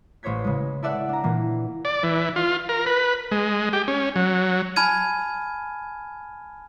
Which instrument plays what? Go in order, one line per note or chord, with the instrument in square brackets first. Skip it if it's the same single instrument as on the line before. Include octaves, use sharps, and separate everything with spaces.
[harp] A1 C5 C#5 G#6 B6
C#3 G#3
E4 A4 D5 E5 F#5
D4 A#5
A#2 E3 A#3
[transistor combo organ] D5
E3
F4
A#4
B4
G#3
G4
C#4
F#3
[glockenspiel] G#5 A5 B5 F6 G#6 D#7